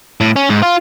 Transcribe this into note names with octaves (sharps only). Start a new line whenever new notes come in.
A2
C#4
G#2
F4